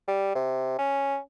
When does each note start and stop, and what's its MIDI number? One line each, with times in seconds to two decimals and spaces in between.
0.08 0.32 55
0.35 0.75 48
0.79 1.18 61